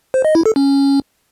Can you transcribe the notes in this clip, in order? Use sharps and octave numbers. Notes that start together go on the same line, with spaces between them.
C5
D#5
E4
A4
C#4